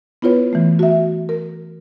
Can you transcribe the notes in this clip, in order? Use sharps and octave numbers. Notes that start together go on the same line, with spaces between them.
B3 E4 F4 B4 C#5
E3 A3
F#4 E5
A#4